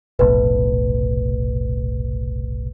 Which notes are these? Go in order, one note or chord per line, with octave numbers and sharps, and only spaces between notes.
F1 B1 A2 B4